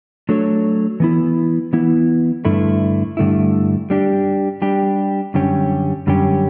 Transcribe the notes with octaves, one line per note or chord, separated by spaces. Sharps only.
F#3 A3 D4 A4 C#5
E3 B3 E4
E3 B3 E4
G2 D3 A3 E4
G2 D3 A3 E4
G3 D4 G4
G3 D4 G4
F#2 D3 G3 C#4 G4
F#2 D3 G3 C#4 G4